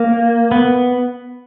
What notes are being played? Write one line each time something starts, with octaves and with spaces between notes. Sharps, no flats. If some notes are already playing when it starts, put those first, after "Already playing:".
Already playing: A#3
B3